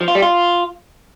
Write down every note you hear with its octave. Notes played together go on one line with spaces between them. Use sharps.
F3
F4
G3
F4